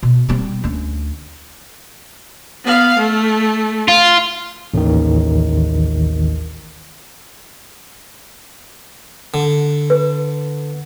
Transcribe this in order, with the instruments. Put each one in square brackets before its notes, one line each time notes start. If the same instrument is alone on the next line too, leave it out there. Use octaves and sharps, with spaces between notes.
[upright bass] B2
G3 C4
D2 C#4
[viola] B3 F5
A3
[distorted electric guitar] F4
[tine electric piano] A1 D#2 D#3
[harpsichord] D3
[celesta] B4